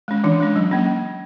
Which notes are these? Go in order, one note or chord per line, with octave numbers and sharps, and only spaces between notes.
G#3 C#4
E3 D4
G#3 C#4
F#3
A#3 C#4